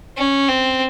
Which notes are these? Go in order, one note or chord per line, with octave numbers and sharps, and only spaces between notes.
C#4
C4